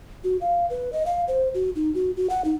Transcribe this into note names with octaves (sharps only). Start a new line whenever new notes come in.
F#4
F5
B4
D#5
F5
C5
F#4
D#4
F#4
F#4
F#5
D#4